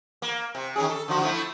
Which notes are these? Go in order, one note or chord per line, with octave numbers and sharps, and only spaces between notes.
A#3
C3
D#3 C#4 G#4
A4
D3 F3 F#4
F3 A3 E4